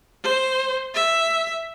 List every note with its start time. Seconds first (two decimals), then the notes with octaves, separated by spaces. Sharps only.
0.24 C5
0.95 E5